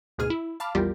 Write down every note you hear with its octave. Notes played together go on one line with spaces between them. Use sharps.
D2 G#2 B2 G#4 F6 D#7
E4
F5 A5 B5 D6 F6
A#1 E2 G3 F4 G4 A#4